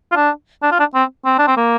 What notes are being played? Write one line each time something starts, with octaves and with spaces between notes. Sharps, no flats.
F4
D4
D4
F4
D4
C4
C4
D4
C4
A#3